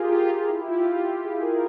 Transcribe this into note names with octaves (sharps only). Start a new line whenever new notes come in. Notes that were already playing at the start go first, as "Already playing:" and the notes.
Already playing: F4 G4 G#4 A#4
F4
F4
E4
G4
F4
F4
G4
G#4
A#4